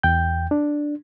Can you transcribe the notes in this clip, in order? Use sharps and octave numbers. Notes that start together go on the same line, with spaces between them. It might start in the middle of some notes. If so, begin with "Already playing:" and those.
E2 G5 G6
D4